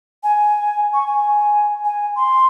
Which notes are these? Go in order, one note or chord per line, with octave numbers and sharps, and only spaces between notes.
G#5
C#6
G#5
G#5
C6